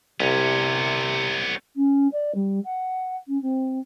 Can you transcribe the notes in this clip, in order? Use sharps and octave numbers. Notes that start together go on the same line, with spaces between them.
C2 C3 B3 C#4
C#4
D5
G3
F#5
C#4
C4